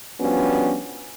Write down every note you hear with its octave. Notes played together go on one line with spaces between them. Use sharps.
F3 G3 B3 C#4 D4 F#4